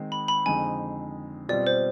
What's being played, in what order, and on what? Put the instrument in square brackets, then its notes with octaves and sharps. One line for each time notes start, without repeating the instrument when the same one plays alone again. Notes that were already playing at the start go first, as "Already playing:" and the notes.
Already playing: [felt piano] D#3 G#3 C4 D#4
[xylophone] B5
B5
[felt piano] F2 D3 G#3 C4 D#4 [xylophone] G#5
[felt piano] B2 G3 C4 F4 [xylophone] D5
[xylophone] C5